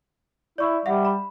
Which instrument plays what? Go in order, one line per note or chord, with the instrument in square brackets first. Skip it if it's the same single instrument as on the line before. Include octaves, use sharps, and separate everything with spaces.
[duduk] E4 [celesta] D5 C#6
[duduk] G3 [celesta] E5 F#5
[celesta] B5